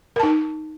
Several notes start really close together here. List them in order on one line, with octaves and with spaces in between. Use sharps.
A#4 A5 D#4